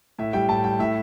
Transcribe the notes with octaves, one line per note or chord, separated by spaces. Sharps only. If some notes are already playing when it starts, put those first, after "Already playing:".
A2 E5
G3 G5
A2 A5
G3 G5
A2 E5